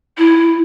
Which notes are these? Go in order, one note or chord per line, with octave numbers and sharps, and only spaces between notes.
E4